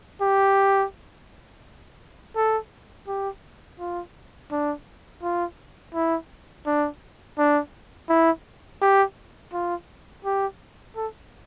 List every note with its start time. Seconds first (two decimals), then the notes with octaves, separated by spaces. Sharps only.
0.21 G4
2.36 A4
3.08 G4
3.79 F4
4.51 D4
5.23 F4
5.95 E4
6.66 D4
7.38 D4
8.09 E4
8.82 G4
9.53 F4
10.25 G4
10.96 A4